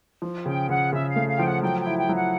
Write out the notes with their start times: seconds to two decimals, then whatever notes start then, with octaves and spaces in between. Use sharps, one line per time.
0.22 F3
0.46 C#3 G5
0.69 C#3 F#5
0.93 C#3 E5
1.09 F5
1.16 A3
1.28 F5
1.37 F3 G5
1.45 F#5
1.62 F#3 G5
1.80 G5
1.86 E4
1.97 G5
2.09 F#3
2.16 F#5